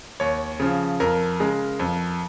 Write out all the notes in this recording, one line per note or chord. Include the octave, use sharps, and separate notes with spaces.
D#2 C#5
C#3 F3
F2 A#4
C#3 G#3
F2